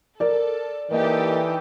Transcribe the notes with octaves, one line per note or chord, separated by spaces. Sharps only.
A4 A#4 D5
E3 A#3 D#4 G4 A4 D#5